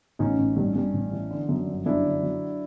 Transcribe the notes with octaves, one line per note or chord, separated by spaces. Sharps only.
A1 C#4 D#4
A1
G2
G2
A1
E3
D3
F#2
G1
F#2 D4 E4
D3
F#3